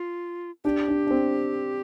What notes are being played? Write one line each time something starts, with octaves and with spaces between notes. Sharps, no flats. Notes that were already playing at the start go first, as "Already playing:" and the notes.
Already playing: F4
D4 G4
D4
D4
C4